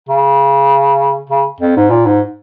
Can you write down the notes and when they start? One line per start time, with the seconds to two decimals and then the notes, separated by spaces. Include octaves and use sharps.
0.09 C#3
1.30 C#3
1.61 F2
1.77 G#2
1.91 A#2
2.06 G#2